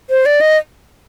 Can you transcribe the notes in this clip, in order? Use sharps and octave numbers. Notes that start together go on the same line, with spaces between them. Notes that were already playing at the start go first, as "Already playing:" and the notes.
C5
D5
D#5